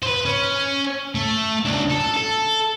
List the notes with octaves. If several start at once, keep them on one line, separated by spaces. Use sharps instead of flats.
B4 C5
C#4
A3
C#2 D4
A4
A4